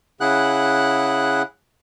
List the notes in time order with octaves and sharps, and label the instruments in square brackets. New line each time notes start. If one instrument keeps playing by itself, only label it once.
[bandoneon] C#3 E4 G#4 F#5 F#6